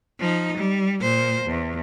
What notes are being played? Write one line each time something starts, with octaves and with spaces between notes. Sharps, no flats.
F3 D#4
G3
A#2 C5
E2